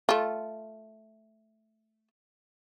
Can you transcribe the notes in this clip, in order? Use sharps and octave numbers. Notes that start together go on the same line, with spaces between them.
A3 F4